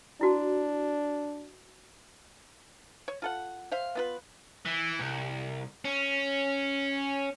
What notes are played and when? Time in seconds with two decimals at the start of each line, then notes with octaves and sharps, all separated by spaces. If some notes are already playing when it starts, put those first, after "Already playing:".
0.21 D4 E4 F#4 A5
3.08 C#5
3.22 F4 A4 F#5
3.71 C5 E5 F5
3.95 B3 F4 B4
4.66 E3
5.00 C2
5.85 C#4